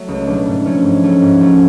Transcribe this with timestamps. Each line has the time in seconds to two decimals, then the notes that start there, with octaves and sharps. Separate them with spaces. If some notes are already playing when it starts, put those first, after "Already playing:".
Already playing: F#3 A3
0.08 C#2
0.27 B2 F#3 A3 D4
0.46 G#2
0.65 F3 A3 C#4
0.84 G#2
1.03 F3 A3 C#4
1.22 G#2
1.41 F3 A3 C#4